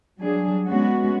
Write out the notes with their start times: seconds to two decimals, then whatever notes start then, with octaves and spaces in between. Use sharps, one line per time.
0.19 F#3 G3 D4 G#4
0.67 G#3 B3 C#4 F#4